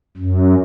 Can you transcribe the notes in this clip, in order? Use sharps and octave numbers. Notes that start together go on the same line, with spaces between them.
F#2